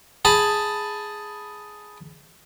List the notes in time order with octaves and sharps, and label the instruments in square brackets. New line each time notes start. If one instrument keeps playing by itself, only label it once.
[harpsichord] G#4 A5 B5